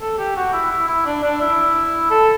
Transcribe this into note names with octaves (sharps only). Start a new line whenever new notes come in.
A4
G4
F#4
E4
E4
E4
D4
D4
E4
A4